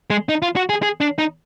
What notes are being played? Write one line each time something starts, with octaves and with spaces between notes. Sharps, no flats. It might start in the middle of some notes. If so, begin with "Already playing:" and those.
G#3
D#4
F4
F#4
G#4
G#4
D4
D#4